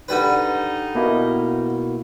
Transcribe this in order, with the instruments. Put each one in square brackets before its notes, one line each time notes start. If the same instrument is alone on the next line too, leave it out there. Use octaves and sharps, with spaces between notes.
[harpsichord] D3 G3 B4 [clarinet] D#4
[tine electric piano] B2 A#3 E4